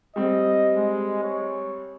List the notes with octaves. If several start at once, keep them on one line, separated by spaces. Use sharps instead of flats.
G3 C4 D#5
G#3
C#5